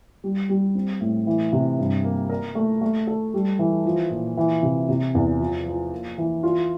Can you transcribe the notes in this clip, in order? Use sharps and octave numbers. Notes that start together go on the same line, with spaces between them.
G3
G3
C4
A2
E3
C3
G2
A#3
A#4
A3
A3
A4
G3
E3
F3
A#2
E3
C3
C3
E2
F3
F3
A#3
E3
F4